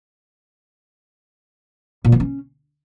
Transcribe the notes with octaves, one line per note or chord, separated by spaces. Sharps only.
A#2
E3
C#4